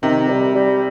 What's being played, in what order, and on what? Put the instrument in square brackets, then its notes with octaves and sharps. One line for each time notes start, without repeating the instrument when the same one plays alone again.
[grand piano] C3 [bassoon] D#3
[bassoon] G3
G3